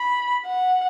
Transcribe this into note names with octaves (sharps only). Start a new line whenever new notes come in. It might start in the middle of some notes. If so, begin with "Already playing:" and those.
Already playing: B5
F#5